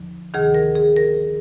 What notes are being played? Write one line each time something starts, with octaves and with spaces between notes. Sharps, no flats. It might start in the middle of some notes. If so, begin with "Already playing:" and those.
Already playing: D#2 D3 F3
D2 C3 D#3 G#4
A#4
G#4
A#4